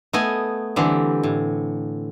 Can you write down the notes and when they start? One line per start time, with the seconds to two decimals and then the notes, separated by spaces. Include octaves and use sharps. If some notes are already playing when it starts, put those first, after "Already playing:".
0.13 A3 B3 D#5 G#5
0.76 D3 E3 G3 C4
1.23 A2